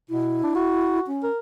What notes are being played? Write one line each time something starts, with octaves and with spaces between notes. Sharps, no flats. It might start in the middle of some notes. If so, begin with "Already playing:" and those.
B2 E4
D4
F#4
C#4
A#4